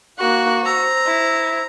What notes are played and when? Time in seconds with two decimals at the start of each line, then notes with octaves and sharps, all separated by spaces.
0.19 A#3 F#4 C#6 F#6
0.66 C5 A#5 E6
1.06 E4